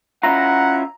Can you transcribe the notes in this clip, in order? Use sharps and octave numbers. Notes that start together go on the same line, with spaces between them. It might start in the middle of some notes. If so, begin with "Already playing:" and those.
C#4 E4 F4 F#5 A#5